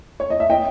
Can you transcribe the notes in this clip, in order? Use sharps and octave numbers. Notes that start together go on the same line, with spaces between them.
C#5
D#5
E5
D#5 G5